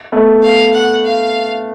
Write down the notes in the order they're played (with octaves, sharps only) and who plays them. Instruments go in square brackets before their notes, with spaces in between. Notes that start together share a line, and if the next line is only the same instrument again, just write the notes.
[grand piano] A3 B3
[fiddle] F5
F#5
F5